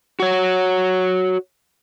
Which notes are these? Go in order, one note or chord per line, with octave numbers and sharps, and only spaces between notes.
F#4 C#5